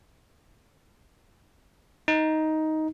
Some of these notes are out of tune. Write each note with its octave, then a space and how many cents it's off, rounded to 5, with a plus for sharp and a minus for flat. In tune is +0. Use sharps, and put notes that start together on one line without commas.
D#4 +10